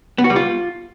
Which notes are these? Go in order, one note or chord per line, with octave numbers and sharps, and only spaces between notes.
B3
F#4
G3
F4